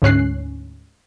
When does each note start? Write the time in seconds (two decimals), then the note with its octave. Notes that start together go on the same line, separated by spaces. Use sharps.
0.02 D2 G#2 C#4 F#6 C7